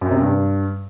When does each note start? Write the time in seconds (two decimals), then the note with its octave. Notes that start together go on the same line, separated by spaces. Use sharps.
0.01 F#2
0.11 C3
0.21 G2